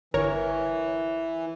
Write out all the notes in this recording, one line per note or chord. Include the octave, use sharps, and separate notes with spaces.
G1 E3 A#4 C#5